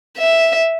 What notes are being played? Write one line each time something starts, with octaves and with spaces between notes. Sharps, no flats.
E5